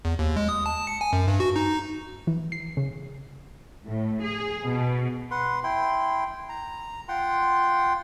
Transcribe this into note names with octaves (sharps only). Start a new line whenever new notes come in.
E2
D#2
G#3
D#6
A5
C#7
G#5
F#2
G2
F#4
D#4
E3
C7
C#3
A2
G#4
B2
B4 F#5 C6
E4 G5 C6
A#5
F4 F#5 G5 C6